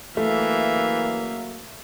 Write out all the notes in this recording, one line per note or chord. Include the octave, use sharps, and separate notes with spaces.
C#3 E3 F#3 A3 A#3 E5 F5